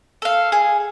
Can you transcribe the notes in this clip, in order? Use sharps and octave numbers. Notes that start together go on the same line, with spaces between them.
A4 F5
G#4